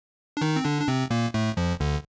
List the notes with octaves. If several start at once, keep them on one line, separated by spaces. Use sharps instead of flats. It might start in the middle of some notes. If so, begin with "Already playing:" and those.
D4
D#3 D#4
C4
D3 D4
D4
C3 C4
A#2 A#3
A2 A3
F2 F3
D2 D3